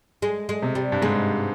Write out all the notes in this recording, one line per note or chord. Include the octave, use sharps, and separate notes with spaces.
G#3
G#3
C3
G3
G2
G#2 G#3